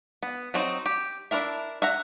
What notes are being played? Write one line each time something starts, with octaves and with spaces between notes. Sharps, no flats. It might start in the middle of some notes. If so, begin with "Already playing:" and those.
B3
F#3 C4 D#4
G4
D4 E4 A#4 E5
E5 F#5 A#5